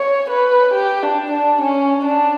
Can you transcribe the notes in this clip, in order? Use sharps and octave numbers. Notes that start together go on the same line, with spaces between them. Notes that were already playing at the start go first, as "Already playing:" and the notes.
Already playing: C#5
B4
G4
D4
D4
C#4
D4